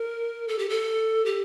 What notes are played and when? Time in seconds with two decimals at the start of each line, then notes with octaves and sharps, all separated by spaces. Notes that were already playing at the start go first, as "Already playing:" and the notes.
Already playing: A#4
0.48 A4
0.59 G4
0.69 A4
1.26 G4